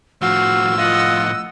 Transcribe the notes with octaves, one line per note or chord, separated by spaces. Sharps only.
A2 F3 F#4 F5 E6
F4 D#5 F#5